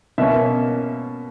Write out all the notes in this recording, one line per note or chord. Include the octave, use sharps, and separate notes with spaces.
B2 A#3 C#4 E5